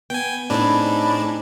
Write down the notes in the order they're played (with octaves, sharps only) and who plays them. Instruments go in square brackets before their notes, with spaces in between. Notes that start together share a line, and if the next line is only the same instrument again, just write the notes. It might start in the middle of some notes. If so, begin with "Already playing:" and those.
[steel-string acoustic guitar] B3 [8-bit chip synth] G5 G#5
[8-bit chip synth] A2 D4 [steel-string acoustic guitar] C4 D#4 G#4 [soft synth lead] B5